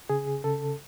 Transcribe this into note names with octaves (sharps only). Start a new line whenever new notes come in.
C#3 G#4
C#3 A4